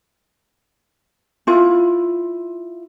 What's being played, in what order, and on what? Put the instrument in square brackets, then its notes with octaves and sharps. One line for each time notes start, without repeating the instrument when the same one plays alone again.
[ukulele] E4 F4